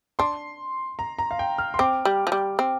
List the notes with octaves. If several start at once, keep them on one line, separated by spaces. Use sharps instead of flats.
D4 C6
A#5
A#5
F5
G5
F6
C6
C4 D6
G3
F3
G3
C4